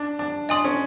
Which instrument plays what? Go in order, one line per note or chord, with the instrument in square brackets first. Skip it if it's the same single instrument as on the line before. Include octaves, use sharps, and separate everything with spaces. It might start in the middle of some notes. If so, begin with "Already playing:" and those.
Already playing: [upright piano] D4
D4
[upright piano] D4 [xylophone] D#5 G#5 C6 D#6
[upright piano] C#4